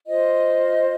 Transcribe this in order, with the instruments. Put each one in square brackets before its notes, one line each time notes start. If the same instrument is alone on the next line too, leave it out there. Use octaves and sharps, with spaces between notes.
[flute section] F4 C5 D#5